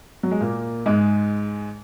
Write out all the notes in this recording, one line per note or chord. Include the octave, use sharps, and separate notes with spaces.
F#3
G#3
A#2 A#3
G#2 G#3